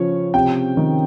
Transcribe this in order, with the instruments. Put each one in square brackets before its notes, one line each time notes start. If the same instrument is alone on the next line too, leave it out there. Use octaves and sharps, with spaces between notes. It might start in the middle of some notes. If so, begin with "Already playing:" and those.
Already playing: [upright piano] C#3 F3 [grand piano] C#5
[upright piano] C3 [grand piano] G5
[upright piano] D#3